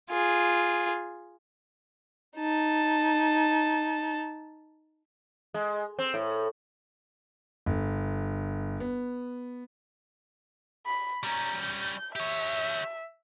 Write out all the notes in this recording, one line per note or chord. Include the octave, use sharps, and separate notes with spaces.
F4 G#4
D#4 A5
G#3
C4
A2
G1
B3
B5
G3 C#4 A#5
G6
G4 C#5 E5